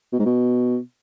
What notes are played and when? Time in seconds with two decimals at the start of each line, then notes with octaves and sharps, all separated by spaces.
0.12 B2
0.19 G#2
0.25 B2